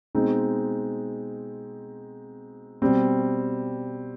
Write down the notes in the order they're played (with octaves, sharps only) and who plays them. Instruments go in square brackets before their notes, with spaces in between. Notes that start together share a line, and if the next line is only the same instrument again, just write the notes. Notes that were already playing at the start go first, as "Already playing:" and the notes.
[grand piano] B2 G#3 C4 D#4
B2 G3 C4